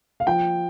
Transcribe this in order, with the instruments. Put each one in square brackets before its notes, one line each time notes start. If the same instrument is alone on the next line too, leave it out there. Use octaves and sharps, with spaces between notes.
[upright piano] F5
F3 G5